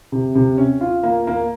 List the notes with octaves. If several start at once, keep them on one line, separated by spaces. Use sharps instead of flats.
C3
C3
C#4
F4
A#3
A#3